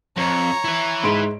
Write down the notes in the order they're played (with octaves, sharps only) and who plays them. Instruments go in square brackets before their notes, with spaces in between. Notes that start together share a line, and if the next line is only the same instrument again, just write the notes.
[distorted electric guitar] F2 [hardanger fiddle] C#5 A#5
[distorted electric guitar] E4 B4
[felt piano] G#2 C6 D7